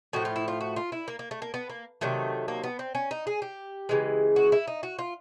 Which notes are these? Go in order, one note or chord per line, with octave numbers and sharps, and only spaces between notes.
A2 F3 A3 F#4
F4
E4
F4
F#4
F4
E4
A#3
A#3
A3
A#3
B3
A#3
C3 D#3 F#3 A3
A#3
B3
C4
C#4
D#4
G#4
G4
C#3 E3 G#3
F#4
E4
D#4
F#4
F4